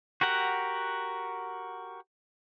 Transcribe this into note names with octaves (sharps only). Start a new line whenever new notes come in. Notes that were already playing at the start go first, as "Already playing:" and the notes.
F#4 G4 A#4 F#5